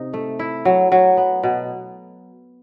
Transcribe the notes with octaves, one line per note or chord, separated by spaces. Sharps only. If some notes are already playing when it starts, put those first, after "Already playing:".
Already playing: C3 D#4
A3
E4
F#3
F#3
B3
B2